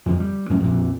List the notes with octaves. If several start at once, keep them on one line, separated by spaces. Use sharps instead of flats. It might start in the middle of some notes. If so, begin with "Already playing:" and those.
F2 D3 F3
G3
F#2 A2 F#3 C#4
A#1 F2 A#2 D3